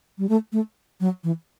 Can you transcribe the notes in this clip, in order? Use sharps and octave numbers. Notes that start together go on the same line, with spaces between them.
G3
A3
A3
F#3
E3